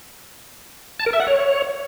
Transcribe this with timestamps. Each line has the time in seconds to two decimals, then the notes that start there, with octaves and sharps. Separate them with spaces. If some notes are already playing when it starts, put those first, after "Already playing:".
1.00 A5
1.06 A#4
1.13 E5
1.20 F#5
1.27 C#5